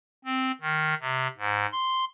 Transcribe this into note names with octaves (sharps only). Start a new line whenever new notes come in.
C4
D#3
C3
G#2
C6